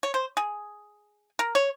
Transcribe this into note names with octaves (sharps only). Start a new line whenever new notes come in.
C#5
C5
G#4
A#4
C#5